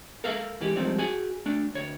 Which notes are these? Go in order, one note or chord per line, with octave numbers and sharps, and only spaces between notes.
A4 A#4 E5 F5
G#2 E3 G4
G#2 F3 G3 A3 C4
F#4 G#4 G#5
A3 D4
D2 C#5